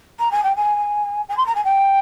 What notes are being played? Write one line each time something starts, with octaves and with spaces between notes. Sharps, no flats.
A#5
G#5
G5
G#5
G#5
C6
A#5
G#5
G5